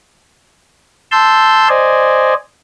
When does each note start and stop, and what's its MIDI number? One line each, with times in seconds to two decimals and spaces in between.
1.12 1.68 81
1.12 1.68 84
1.12 1.68 88
1.12 1.68 91
1.69 2.34 72
1.69 2.34 74
1.69 2.34 75
1.69 2.34 80